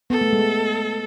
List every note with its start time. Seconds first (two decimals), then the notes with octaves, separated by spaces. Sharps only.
0.10 B3 A4
0.21 A3
0.33 G#3